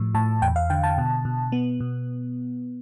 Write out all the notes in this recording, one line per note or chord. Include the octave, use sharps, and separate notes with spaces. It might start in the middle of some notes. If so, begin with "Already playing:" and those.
Already playing: A2 F3
A2 A5
E2 G5
F5
D3 G5
A5
B2
B2
B3
B2